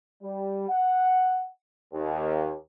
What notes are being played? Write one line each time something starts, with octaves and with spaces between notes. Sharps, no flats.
G3
F#5
D#2